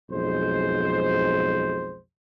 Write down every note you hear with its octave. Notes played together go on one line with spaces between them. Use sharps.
B1 F2 G#3 C5